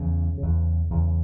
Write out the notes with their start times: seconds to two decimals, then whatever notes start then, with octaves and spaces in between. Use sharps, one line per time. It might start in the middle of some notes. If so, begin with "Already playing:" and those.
Already playing: E2 C#3 C#4
0.38 E2 C#3
0.90 E2 C#3